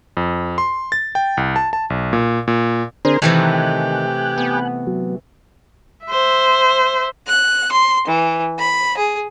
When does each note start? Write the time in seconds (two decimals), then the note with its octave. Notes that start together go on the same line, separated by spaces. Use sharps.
0.17 F2
0.58 C6
0.92 A6
1.15 G5
1.37 C2
1.56 A5
1.73 A5
1.90 B1
2.13 A#2
2.48 A#2
3.05 D3 C4 D4 G#4 A#4 C5
3.22 C3 D#3 E3 A3 G4 G#5 F#6
4.38 B3
4.87 F#3
6.06 C5 E5
7.27 F#6
7.72 C6
8.08 E3
8.58 B5
8.97 G#4